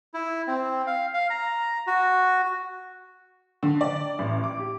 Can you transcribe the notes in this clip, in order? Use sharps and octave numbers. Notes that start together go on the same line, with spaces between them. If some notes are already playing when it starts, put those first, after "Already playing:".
E4
C4
F5
F5
A#5
F#4
D3
D5
A1
D6
G4